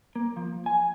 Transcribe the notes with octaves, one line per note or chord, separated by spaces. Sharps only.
A#3
F3
G#5